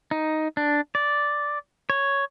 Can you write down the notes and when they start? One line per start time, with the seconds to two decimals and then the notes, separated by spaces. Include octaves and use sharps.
0.11 D#4
0.57 D4
0.95 D5
1.90 C#5